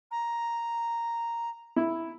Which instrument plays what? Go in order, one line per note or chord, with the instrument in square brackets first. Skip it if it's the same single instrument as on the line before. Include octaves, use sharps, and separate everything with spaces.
[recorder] A#5
[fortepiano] E4